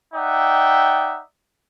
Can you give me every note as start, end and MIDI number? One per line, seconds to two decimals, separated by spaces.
0.14 1.19 63
0.14 1.19 74
0.14 1.19 76
0.14 1.19 78
0.14 1.19 79